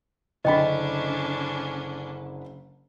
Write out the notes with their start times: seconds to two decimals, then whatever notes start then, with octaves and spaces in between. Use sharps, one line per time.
0.45 F#1 D3 C#4 D4 D#5 G5 B5